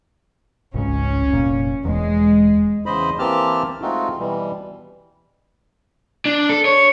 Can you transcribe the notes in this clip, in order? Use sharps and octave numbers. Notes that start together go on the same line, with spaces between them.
G#1 C#2 G#2 C#4
F1 A#2
E1 E2 G#3
E2 C#3 C5 D#5 B5
E3 A#3 C4 G4 A5 F6
G#3 A3 C4 D#4 F4 F#4
B2 E3 G3
D4
A4
C#5